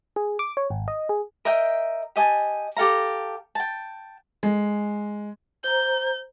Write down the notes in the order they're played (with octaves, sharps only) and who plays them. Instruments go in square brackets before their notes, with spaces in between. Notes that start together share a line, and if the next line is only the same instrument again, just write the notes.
[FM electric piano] G#4
D6
C#5
G#1
D#5
G#4
[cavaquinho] A#4 D#5 E5 G5
G4 D#5 G#5 A5
G4 A4 F5 A#5
G5 A5
[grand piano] G#3
[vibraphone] C5 A#5 [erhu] G6